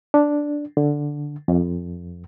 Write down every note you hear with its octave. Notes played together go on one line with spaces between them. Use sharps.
D4
D3
F2